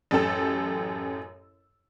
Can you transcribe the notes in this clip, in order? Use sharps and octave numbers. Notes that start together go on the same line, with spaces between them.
A1 F#2 G4 A4 E6